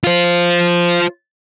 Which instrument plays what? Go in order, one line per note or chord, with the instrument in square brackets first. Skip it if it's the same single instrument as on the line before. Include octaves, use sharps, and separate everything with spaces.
[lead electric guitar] F4 C5